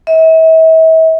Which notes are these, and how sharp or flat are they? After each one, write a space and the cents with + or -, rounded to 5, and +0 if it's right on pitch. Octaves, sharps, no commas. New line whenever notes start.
E5 -40